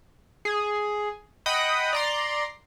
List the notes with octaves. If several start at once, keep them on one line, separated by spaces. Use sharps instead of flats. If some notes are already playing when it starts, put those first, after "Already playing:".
G#4
D#5 F#5 G5 B5 D#6
D5 A#5 C6